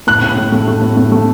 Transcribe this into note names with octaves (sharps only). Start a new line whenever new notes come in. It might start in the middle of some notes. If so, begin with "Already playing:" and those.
A2 F#6
A2
A2
A3
A3
A2
A3
A3